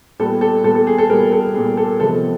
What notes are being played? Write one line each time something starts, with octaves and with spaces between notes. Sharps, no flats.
A#2 G3 B3 A4
A4
A#2 G3 B3 A4
A4
G#4
A4
A#2 G3 B3 G#4 A#4
A4
A#2 G3 B3 G#4
A4
C3 F3 G#3 B3 A4